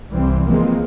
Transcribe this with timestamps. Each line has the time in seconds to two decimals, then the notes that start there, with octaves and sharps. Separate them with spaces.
0.12 C2 E3 G3 C4
0.47 E3 F3 G#3 A#3 C4